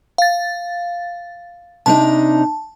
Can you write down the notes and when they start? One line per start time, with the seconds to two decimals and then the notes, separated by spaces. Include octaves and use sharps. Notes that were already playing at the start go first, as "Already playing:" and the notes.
0.18 F5 A6
1.86 C3 D4 D#4 A5